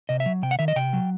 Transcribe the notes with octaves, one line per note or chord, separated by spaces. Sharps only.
C3 D#5
E5
F#3
C3 G5
F#5
D#3 E5
D#5
C3 G5
F#3